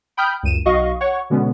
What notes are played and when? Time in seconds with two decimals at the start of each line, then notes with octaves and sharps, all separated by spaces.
0.17 G5 B5 D#6 F6 G6
0.43 C#2 F#2 D#7 E7
0.65 B1 F#4 D#5 F5 C#6
1.01 C#5 F#5 C#6
1.30 B2 D3 G#3 B3 C#4